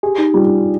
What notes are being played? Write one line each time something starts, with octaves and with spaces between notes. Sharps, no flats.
G4 G#4
D#4
G3 F4